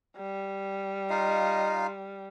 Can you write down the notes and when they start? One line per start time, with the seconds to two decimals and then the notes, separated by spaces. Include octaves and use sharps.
0.17 G3
1.10 D#4 F4 D#5 F5